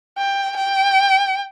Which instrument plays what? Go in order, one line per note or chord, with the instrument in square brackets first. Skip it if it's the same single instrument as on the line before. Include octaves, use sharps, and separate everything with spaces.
[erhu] G5
G5